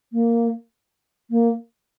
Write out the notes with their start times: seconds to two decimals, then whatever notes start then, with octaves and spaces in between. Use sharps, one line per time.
0.12 A#3
1.30 A#3